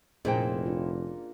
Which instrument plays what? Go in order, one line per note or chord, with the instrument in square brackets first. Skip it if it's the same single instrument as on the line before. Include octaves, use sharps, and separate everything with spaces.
[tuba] F1 [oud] A#2 [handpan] C#4 G#4 D#5 [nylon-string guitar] E4 C5 G5
[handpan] D4 F4